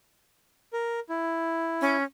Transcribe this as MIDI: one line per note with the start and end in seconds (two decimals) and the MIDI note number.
0.73 1.00 70
1.09 1.96 64
1.81 2.03 61